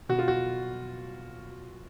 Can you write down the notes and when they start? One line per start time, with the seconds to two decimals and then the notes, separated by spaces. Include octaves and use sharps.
0.09 B2 F#4
0.19 F4
0.28 F#4